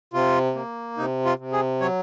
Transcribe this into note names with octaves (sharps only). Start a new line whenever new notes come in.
C3 F4
A#3
C3 D#4
F4
C3
G#4
F#3 C#5